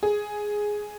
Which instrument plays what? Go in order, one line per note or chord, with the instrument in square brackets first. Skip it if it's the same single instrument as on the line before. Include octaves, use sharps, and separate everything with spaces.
[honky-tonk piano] G#4